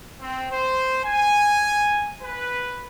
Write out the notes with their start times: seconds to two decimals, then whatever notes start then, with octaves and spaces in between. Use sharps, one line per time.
0.20 C4
0.51 C5
1.04 G#5
2.22 B4